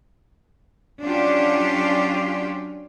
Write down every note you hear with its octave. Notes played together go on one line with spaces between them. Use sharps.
F#3 C#4 D4 F4 G4